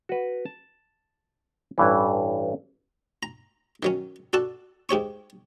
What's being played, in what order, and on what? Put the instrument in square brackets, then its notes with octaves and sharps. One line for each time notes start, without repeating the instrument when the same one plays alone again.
[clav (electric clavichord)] F#4 B4
A5
A1 G2 E3
[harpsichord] A#5
D#3 F#3 C#4
D4 F#4 A4 A5
G#2 G4 C#5 C#6